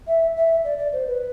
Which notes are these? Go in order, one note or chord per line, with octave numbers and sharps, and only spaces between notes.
E5
E5
D5
D5
C5
B4